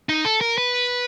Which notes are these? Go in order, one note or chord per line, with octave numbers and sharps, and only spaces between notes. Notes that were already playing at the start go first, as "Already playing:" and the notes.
D#4
A4
A#4
B4